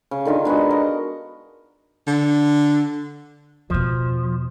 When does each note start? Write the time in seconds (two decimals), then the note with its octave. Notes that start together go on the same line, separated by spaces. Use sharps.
0.11 C#3
0.25 D3 D#3 D#4 F4
0.45 G#3 B3 D4 F#4
0.70 A#4 D#5
2.07 D3
3.70 E2 B2 F3